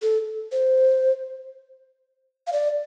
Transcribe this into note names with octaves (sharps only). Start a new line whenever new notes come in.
A4
C5
F5
D5